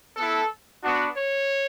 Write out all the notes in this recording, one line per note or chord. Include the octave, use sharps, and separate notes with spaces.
B3 E4 A4
B3 D4 F#4
C#5